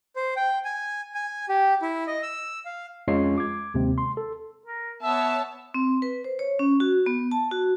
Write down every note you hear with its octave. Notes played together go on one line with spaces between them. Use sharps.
C5
G5
G#5
G#5
G4
E4
D#5
E6
F5
F2 G#3 C#4 F4 C#5 C7
D6 G#6
D#2 C3 G#3 C4
C6
A4
A#4
B3 C#5 E5 A5
C4
B4
C5
C#5
C#4
F#4
B3
A5
F#4